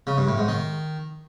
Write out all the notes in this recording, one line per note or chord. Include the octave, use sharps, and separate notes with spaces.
C#3
G2
A2
G#2
D#3